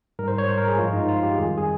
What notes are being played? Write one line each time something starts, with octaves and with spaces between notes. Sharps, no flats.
G#2 G3 A#4
C5
C#5
C5
A#4
G#4
G2 F3 G#3 F4
D#4
F4
G4
F2 D#3 G3 G#4
G#4